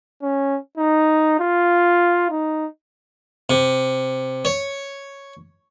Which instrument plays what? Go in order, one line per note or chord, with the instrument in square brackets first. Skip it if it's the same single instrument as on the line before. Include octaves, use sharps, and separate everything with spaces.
[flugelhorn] C#4
D#4
F4
D#4
[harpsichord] C3
C#5